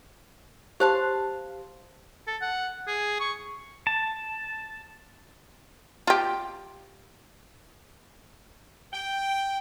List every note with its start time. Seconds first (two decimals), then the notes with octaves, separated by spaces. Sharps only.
0.80 G4 C5 F5 A5 C6
2.28 A4
2.41 F#5
2.88 G#4
3.20 C#6
3.87 A5
6.07 F4 G4
8.93 G5